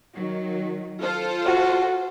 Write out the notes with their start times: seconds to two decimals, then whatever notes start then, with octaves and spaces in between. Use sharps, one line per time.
0.14 D#3 F#3
1.02 F4 A4 C5
1.45 F#4